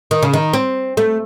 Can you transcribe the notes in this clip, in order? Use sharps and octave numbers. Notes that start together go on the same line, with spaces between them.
D#3
C#3
D#3
C4
A3